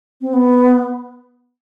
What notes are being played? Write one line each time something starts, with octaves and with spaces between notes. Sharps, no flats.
C4
B3